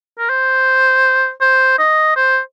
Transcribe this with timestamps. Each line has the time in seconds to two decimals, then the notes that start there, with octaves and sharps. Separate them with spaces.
0.19 A#4
0.30 C5
1.41 C5
1.79 D#5
2.16 C5